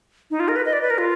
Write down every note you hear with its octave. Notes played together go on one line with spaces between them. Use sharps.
D#4
F4
A#4
B4
D#5
D5
B4
A#4
F4